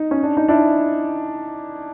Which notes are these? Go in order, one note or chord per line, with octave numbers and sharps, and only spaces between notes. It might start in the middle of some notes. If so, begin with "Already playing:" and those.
Already playing: D#4
C#4
D4
D#4
D4 E4